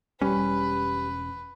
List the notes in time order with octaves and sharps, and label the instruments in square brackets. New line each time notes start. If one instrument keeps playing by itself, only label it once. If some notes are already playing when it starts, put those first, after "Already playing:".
[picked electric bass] E1 C#4 [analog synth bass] G3 [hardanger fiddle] B4